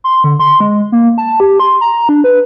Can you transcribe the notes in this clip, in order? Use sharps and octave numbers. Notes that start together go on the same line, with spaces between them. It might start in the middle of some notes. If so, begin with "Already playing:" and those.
C6
D3
C6
G#3
A#3
A5
G4
C6
A#5
D4
B4